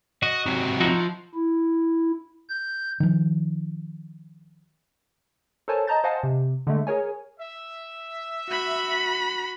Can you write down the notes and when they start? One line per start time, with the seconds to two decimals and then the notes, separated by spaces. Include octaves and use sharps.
0.23 F#4 D#5
0.46 C3 F#3
0.80 F3 D#4 E4 F#4
1.35 E4
2.49 G6
3.00 D#3 F3
5.68 A4 A#4 C5 C#5 G#5 A5
5.87 D#5 A5 A#5 G6 A6
6.04 C5 D#5 F5 F#5 G#5 A5
6.23 C3
6.67 D3 G#3 A3
6.87 G#4 A#4 C#5 G#5
7.38 E5
8.49 F#4 B5